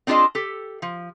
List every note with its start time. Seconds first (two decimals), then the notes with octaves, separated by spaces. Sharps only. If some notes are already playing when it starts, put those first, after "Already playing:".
0.07 C4 D4 F4 G#4 D#5 A5
0.35 G4 A4
0.82 F3